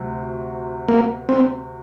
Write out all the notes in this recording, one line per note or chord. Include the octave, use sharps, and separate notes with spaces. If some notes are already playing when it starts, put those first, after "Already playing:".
Already playing: D2 C3 F#3
A#3
C4